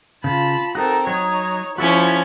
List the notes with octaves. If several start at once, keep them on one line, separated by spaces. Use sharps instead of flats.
C#3 F4 A5 B5
C4 D#4 F#4 A4 A#4
F#3 D#4 C#5
F3 C#4 E4 F#4 A4 F#5 B5